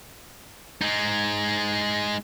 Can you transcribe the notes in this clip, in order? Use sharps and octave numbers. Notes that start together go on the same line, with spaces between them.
G#3 D#4